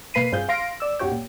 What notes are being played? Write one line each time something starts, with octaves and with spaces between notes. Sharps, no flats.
B2 A#3 B4 B5 C7 D#7
G2 C4 F4 G#4 G6
F5 C6 A#6 D7
D5 E6
B1 F#2 F#4 G4 C#5 G5
A#2